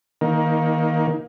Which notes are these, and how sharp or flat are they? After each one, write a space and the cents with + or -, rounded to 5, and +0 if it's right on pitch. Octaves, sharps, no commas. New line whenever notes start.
D#3 +20 A#3 +20